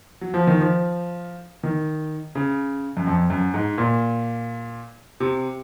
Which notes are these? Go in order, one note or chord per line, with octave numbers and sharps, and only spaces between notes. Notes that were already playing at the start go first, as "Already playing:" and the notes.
F#3
F3
D#3
F3
D#3
C#3
F#2
F2
F#2
G#2
A#2
C3